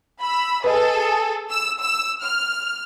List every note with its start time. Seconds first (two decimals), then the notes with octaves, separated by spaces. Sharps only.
0.20 B5 E6
0.64 G#4 A4 B4 D#5
1.50 E6
1.81 E6
2.21 F6